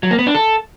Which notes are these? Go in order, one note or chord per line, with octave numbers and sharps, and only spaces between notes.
F#3
A#3
B3
D4
A4